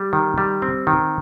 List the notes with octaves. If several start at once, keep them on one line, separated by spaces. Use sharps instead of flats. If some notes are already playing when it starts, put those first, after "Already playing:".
Already playing: G3
D#3
G3
C4
D#3